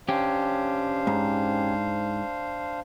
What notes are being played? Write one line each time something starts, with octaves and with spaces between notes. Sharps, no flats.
C#4 D4 G4 C5 F5
G#2